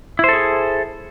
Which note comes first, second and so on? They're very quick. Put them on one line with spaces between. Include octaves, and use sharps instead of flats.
E4 C5 A4 G#4